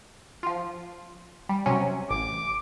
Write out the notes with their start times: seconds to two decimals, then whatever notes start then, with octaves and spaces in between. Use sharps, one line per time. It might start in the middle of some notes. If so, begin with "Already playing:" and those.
0.43 F3 F4
1.49 G3
1.66 C3 F#3 C#4
2.10 A1 D6